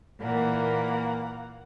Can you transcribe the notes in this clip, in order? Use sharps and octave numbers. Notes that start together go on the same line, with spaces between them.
A#2 E3 A#3 F#5